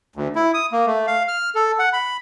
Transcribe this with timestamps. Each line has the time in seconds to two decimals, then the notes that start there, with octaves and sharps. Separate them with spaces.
0.16 D2
0.36 E4
0.54 D#6
0.72 A#3
0.86 A3
1.07 F5
1.28 F6
1.55 A4
1.79 F#5
1.93 B5